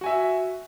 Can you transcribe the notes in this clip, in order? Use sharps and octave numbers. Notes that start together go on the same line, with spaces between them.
F#4 E5 G#5